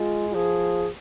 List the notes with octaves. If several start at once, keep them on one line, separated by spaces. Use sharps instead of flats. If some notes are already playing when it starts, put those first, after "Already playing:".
Already playing: G#3 F4
F4
F3 G#4